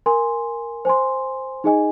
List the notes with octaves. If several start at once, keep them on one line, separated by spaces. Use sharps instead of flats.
A#4 G#5 C6
C5 G#5 C6
D#4 G#4 D#5 G#5